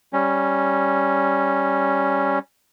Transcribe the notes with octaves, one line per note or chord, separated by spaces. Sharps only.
G3 C#4